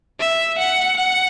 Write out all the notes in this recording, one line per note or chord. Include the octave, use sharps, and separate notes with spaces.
E5
F#5
F#5